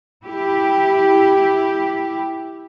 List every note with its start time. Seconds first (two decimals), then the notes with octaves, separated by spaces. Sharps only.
0.25 E4 G4